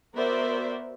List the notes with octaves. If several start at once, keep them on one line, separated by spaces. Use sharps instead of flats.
B3 F#4 A#4 C5 D5 E5